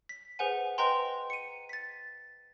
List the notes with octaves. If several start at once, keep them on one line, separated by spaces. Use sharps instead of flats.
B6
G#4 B4 C5 F#5 G#5
B4 C5 D#5 G5 A#5 C6
C#7 D#7
A6 B6